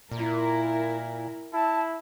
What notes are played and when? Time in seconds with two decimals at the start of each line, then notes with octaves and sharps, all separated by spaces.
0.12 A#2 E4 A#4
1.53 E4 A5